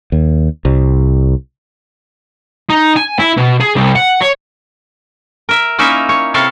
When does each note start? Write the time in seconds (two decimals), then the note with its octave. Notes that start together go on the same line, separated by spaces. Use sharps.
0.12 D#2
0.65 C2
2.69 D#4
2.96 G#5
3.19 E4
3.37 B2
3.60 G#4
3.76 C2
3.95 F#5
4.21 C#5
5.49 A#4 E5
5.79 A#3 C#4 D#4 E4 E5
6.09 C#5
6.34 C3 E4 A4 C#5 F5